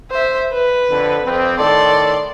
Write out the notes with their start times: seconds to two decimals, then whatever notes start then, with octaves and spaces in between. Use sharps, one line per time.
0.11 C5 E5
0.53 B4
0.90 F2 D3
1.24 F2 C4
1.57 A2 D#3 A4 D5 C6